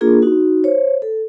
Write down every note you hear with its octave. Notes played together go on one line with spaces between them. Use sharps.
A#3 D4 F4 G#4 A#4
D#4 F#4
C5 C#5
A4